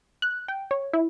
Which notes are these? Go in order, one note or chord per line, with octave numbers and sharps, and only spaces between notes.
F#6
G5
C#5
E4